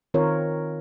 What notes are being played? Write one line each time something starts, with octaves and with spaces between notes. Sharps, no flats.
D#3 C4 F4 A#4 C#5